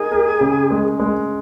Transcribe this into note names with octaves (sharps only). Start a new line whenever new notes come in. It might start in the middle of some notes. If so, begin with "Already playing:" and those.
Already playing: D#4 G#4 A#4
A#4
C#3
G#3
G#3